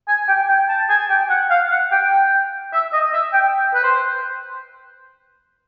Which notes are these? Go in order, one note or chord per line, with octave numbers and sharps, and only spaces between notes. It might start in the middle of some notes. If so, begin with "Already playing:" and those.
G#5
G5
G5
A5
G#5
G5
F#5
F5
F#5
G5
E5
D#5
E5
G5
B4
C5